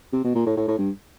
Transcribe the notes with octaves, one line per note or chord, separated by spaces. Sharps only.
C3
B2
A#2
A2
A2
A2
G2